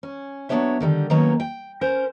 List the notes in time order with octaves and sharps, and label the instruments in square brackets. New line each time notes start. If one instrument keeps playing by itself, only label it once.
[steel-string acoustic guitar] C#4
F#3 G#3 B3 D4 C#5 E5
D3 D#3 G3
D#3 F#3 A#3 B3 C#4 C#5
G5
C#4 A#4 C5